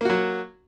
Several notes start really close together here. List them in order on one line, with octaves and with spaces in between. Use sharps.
A#3 F#4 F#3